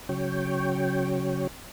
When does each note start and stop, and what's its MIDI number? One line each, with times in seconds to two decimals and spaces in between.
0.09 1.47 49
0.09 1.47 54
0.09 1.47 73
0.09 1.47 79